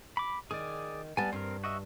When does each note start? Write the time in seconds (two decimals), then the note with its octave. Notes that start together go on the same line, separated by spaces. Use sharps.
0.17 B5 D6
0.51 D#3 G#4 D5
1.17 G3 B3 G#5 A5
1.33 G2 C4 A#4
1.64 F#4 D#5 E5